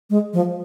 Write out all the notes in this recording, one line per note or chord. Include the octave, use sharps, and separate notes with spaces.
G#3
F3